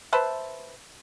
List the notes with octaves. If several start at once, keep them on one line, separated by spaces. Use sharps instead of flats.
B4 C5 E5 A5